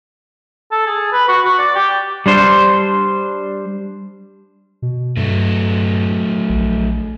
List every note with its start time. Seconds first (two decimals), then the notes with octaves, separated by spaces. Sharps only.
0.71 A4
0.86 G#4
1.12 B4
1.28 F#4
1.45 F#4
1.59 D5
1.75 G4
2.26 G3 D4 C5
4.82 B2
5.17 G2 F#3 A3
6.49 A#1